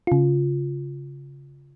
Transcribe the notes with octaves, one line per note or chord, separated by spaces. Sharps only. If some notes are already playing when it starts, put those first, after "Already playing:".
C#3 F4